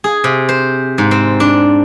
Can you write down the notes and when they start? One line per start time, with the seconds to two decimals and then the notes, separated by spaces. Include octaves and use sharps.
0.04 G#4
0.24 C3
0.49 C5
0.98 G#2
1.11 C4
1.40 D4